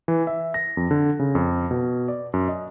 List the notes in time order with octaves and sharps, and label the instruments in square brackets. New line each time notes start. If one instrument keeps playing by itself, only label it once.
[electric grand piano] E3
E5
A#6
F2
D3
C#3
F2
B2
D5
F#2
D#5